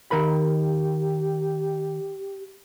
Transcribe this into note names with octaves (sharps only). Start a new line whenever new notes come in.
D#3 G4 A#4 B5